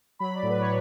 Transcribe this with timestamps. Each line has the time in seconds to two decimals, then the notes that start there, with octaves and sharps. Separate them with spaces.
0.19 F#3 B5
0.35 D5
0.43 A2
0.50 B4
0.60 C#5
0.65 F#3 D5